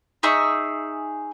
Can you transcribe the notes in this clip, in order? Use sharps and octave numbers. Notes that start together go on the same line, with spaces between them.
D#4 G#4 E5 C#6